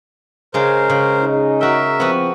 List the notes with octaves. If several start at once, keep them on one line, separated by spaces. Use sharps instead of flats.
C#3 G#3 A#4 C5
C#3
C#4 D#4 G#4
F#4 A#4 E5 G5
F3 B3 C4 F#4